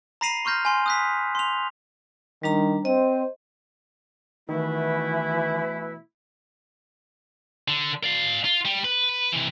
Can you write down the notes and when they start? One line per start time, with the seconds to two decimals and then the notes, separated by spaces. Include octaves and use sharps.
0.21 A#5 B5 A#6 C7 D#7 F7
0.45 C6 C#6 F6 G6 A#6
0.65 G#5 C6
0.86 D#6 F#6 B6
1.35 C6 F7
2.43 D#3 G3 D4 A#5
2.85 C4 C5 D#5
4.49 B2 D#3 E3 A3 E4 B4
7.68 D3
8.04 D5 F5
8.45 F4
8.65 G3
8.85 B4
9.32 C3 E3